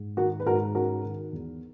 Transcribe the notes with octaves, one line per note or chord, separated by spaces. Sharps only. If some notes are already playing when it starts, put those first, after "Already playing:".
Already playing: G#2
D#3 F#4 A#4
B4
G#2 F#4 A#4
C#4 F#4 A#4
D#3
E2